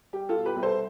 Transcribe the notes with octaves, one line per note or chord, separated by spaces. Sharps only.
G3 G4
F4 A4
B2
G4 B4
C2
A4 C5